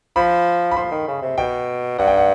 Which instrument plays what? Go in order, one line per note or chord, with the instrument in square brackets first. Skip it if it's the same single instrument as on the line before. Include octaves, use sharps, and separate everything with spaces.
[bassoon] F3 [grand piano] B5
[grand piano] B5
[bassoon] F3 [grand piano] C6
[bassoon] D#3
C#3
C3
[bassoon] B2 [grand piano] G5
[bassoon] G2 [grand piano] F#5
[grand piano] G5
F#5